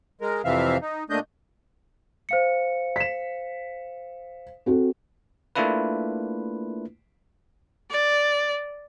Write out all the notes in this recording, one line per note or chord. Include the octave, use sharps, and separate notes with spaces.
G#3 A#4
F2 C3 E3 C4 E5 F5
D#4
A#2 A3 D4 D#5 G6
C5 F5 C#7
B6 E7
C4 F#4 A4
A3 A#3 D4 E4 F4 B4
D5